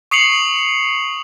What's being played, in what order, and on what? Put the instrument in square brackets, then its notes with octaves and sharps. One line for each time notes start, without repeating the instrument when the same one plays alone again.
[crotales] C#6 D#6 C7 C#7 F7 F#7